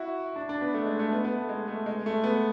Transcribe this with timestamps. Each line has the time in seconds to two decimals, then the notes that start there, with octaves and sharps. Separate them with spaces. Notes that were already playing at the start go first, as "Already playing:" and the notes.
Already playing: E4 F#4
0.36 D4
0.49 D4
0.61 B3
0.74 A3
0.86 G#3
0.99 A3
1.12 B3
1.25 B3
1.36 A3
1.49 G#3
1.68 A3
1.86 G#3
2.06 A3
2.24 B3